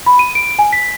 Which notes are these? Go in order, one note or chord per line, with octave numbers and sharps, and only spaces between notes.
B5
D#7
D7
G#5
B6